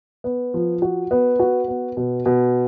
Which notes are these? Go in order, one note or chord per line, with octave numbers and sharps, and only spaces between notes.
B3
F3
F#4
B3
F#4
B3
B2
B2